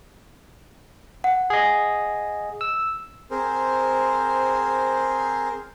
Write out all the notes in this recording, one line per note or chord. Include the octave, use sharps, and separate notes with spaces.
F#5
G#4 D#5
E6
C4 G#4 A#4 C5